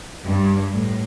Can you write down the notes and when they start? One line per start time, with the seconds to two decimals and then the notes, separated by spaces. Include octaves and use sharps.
0.24 G2
0.74 A2